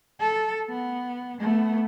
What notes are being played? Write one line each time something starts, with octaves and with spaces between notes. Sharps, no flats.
A4
B3
A3 B3